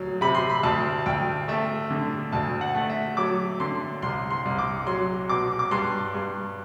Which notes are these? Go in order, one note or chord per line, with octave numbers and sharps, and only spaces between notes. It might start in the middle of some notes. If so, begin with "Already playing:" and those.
Already playing: D2 F#3
C3 B5
C6
B5
D2 A5
D2 G5
A3 E5
D3
D2 A5
F#5
A3
E5
F#3 D6
D3 C6
C2 C6
C6
C2
D6
F#3 C6
B2 D6
D6
G2 C6
G2